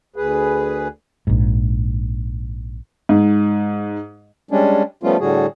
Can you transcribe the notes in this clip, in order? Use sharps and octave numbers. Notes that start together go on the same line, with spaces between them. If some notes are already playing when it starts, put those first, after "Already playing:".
D2 G#4 B4
A#1 G#2
G#2
G3 G#3 C#4 D4
F3 G3 A3 B3 C#4 F4
A2 D3 G3 F#4 G#4